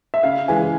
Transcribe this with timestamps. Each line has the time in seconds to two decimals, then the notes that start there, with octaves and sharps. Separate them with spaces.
0.14 E5
0.23 C#3 F5
0.48 E3 G#3 G#5